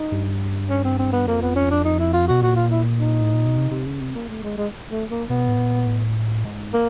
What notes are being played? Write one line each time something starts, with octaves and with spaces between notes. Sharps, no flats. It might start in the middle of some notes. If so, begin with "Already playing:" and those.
Already playing: D#4
G2
C#4
C4
C4
B3
F2 A#3
B3
C#4
D4
D#4
E4
F4
B2 F#4
A#2 F#4
F4
E4
D#4
A2
A#2
B2
C3
C3
C#3
C3
A#3
A3
G#3
G#3
A3
A#3
B2 B3
A2
A#2
A2
G#2
A#3